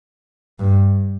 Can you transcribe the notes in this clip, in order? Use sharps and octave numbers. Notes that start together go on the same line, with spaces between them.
G2